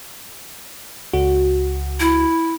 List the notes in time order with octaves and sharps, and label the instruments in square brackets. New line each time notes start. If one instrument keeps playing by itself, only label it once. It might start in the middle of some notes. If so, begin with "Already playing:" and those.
[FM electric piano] C#2 F#4
[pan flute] E4